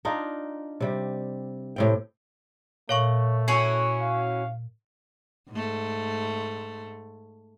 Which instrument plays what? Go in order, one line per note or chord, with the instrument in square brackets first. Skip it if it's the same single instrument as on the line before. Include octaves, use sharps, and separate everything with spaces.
[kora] D4 D#4 F4
C3 G3
A2 C3 G5
[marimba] A#2 [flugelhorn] A3 [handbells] C#5 F5 C#6
[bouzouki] C#4 E4 F#4 [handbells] C#6 C7
[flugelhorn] F5
[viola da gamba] G#2 A3